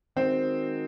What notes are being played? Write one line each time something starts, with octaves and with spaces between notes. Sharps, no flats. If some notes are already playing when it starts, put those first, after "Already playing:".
D#3 G#3 C4 D#4 F#4 A#4